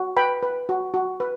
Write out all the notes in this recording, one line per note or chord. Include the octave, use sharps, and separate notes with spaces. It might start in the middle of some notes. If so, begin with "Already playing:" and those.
Already playing: F#4
B4 G5 B5
B4
F#4
F#4
B4